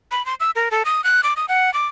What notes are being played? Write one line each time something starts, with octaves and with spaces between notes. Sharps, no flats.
B5
C6
E6
A#4
A4
D#6
F#6
D6
D#6
F#5
D6